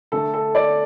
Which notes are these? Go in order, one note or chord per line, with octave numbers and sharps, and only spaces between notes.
D3 A3 A4
A4
D5